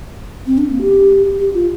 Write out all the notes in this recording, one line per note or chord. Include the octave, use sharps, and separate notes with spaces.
C4
D4
A#3
G4
G4
F4